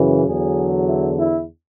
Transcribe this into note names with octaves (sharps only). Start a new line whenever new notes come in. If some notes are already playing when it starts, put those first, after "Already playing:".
Already playing: F#2 C#3 E3
E2 D3 F#3 G#4
E4
E4